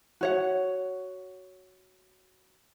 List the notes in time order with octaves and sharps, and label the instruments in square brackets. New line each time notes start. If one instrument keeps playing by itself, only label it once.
[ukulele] F#4 C#5 F#5